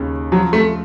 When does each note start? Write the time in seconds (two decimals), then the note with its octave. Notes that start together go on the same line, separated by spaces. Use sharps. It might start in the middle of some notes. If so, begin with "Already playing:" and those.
Already playing: D#2 C#3
0.32 F3 F#3
0.53 A3